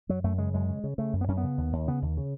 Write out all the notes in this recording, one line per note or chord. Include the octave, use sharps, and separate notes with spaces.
F#2 F#3
F#2 A3
C#3 G#3
F#2 G#3
C#3
C#3
C#3 A3
F#2
B3
F#2 C#4
B3
C#3
D#2
D#2
C#3 B3
D#2
C#3